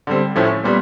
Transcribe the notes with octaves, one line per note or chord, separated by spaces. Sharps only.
D3 G3 C4
A2 F3 A3 C#4 E4
A#2 G3 B3